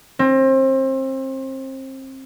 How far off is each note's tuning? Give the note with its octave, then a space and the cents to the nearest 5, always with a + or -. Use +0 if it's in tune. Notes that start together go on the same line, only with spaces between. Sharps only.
C4 +30